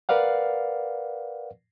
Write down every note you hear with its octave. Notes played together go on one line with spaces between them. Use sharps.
A#4 B4 D5 F5 F#5